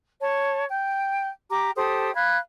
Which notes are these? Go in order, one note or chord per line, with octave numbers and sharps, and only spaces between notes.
C#5 A5
G5
G4 A#5 D6
G4 A4 C5 D#6
F5 B5 F#6 G#6